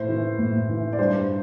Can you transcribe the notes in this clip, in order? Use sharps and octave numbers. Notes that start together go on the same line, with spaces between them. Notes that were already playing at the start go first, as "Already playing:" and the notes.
Already playing: A2 C5
E3
A2
E3
D5
G2 C5